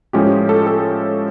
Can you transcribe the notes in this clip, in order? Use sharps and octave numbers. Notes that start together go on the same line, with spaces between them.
A2 F3 G#3 C#4 G4
A4
A4